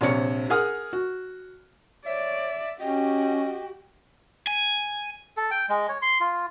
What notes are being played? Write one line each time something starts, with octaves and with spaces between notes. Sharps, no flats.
A#1 C3 C#5 C#7
G#4 A#4 F#5 D#6 F6
F#4
C#5 D5 E5
C#4 F#4 G4 D#5 G5
G#5
A4
G5
G#3
C#5
C6
F4